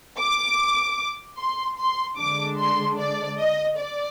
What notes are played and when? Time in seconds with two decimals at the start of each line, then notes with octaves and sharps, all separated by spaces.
0.18 D6
1.39 C6
1.78 C6
2.18 D3 G#3 D4 D6
2.58 C6
2.98 D5
3.38 D#5
3.78 D5